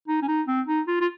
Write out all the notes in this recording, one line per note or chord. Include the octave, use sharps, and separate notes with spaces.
D#4
C#4
D#4
C4
D#4
F4
F4